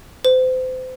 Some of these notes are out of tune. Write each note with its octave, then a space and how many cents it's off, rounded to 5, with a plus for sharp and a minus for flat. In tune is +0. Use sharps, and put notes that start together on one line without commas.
C5 -35